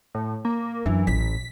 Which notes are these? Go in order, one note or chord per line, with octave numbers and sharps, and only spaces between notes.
A2
A#3
F#2 E3 D4
A1 B6